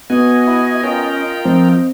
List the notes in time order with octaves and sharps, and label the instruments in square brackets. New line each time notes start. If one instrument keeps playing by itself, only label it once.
[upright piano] B3 [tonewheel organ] F#4 G#5 [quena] D#5
[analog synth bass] E4
[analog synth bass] C#4 [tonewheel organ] F4 A#4 G5
[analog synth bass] F3 [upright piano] C4 [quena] D#5